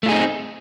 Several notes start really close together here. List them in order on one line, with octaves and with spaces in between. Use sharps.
A3 F4 G#4 D#4 C4